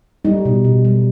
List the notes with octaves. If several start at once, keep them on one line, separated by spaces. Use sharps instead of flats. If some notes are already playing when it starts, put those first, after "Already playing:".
G3 D#4
B2
B2
G3